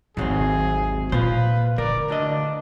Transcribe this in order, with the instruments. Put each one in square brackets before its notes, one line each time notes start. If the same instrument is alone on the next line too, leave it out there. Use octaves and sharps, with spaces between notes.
[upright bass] G#1 D#2 [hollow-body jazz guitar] G#2 F#3 C4 [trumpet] G#4
[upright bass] A#2 [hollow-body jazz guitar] F4 C5 [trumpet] B4
[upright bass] D3 [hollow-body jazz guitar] A#4 [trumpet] D5
[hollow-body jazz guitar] D2 D#5 [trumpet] D4